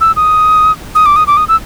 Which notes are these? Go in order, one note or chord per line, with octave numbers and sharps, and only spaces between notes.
E6
D#6
D#6
D6
D#6
D6
D#6
E6